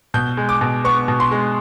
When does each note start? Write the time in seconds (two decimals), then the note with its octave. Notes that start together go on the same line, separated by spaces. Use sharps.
0.14 B2 G6
0.37 G#3
0.49 D6
0.61 B2
0.84 B3 C#6
1.08 B2
1.20 C6
1.32 G#3